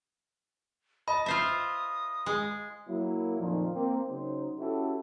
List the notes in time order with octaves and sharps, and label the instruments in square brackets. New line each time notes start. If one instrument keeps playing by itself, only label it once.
[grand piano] D#5 [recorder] A5 [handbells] B5
[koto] F4 C5 E5 [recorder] D#6
[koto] G#3
[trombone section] F#3 A#3 E4
F2 A#2 D#3 F3 D#4 F4
A#3 C4
C#3 F#3 D#4 C5
C#4 E4 F#4 G4 A4